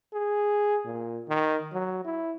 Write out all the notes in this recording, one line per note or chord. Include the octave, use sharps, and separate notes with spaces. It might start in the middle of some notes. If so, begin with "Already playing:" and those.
G#4
A#2
D#3
F#3
E4